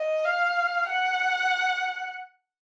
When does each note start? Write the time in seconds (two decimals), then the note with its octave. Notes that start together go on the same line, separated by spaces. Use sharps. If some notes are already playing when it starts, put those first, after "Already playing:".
Already playing: D#5
0.25 F5
0.88 F#5